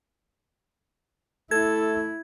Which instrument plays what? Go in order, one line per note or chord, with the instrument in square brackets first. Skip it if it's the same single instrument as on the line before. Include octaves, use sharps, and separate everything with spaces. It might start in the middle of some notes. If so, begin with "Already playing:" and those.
[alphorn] A3 [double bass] E4 [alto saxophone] A4 [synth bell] G#6